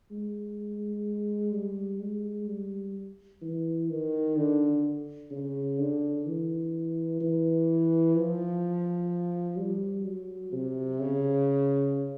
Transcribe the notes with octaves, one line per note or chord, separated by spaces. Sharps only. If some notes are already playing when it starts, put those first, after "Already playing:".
G#3
G3
G#3
G3
E3
D#3
D3
C#3
D3
E3
E3
F3
G3
F#3
C3
C#3